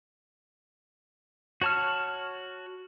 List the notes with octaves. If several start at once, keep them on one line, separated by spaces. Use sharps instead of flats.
F#4 C#5 A5 C#6 F6